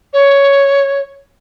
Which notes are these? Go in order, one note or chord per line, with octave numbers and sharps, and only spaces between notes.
C#5